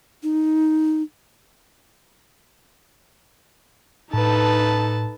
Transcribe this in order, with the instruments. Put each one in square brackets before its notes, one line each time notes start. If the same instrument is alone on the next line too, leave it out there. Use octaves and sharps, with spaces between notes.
[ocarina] D#4
[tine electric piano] A2 [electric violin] D#4 A4 [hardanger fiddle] B4 A5